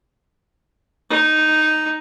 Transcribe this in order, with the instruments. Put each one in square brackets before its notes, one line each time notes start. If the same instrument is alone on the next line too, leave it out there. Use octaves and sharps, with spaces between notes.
[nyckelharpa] D#4